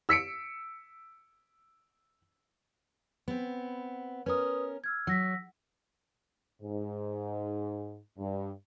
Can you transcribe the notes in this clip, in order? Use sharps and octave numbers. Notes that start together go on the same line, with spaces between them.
E6 B6 C#7 D7
B3 C4
C#4 A#4 B4 D#6
E6 F6 G#6
F#3 E6 A#6 B6
G#2
G2